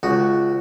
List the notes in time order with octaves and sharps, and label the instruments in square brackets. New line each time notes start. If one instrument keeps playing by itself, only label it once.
[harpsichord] C#2 F#4